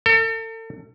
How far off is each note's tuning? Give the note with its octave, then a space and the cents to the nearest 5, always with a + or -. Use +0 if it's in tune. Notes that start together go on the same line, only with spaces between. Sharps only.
A4 +40